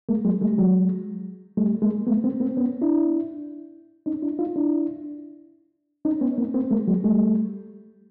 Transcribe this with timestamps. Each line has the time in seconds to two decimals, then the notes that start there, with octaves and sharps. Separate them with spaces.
0.09 G#3 A#3
0.25 F#3 G#3
0.41 G3 A3
0.58 F#3 G#3
1.57 G3 A3
1.82 G#3 A#3
2.07 A3 B3
2.24 A#3 C4
2.40 A#3 C4
2.57 B3 C#4
2.82 D4 E4
4.06 C#4 D#4
4.22 D4 E4
4.39 D#4 F4
4.56 D4 E4
6.05 C#4 D#4
6.21 B3 C#4
6.38 A#3 C4
6.54 A#3 C4
6.71 G#3 A#3
6.87 F#3 G#3
7.04 G3 A3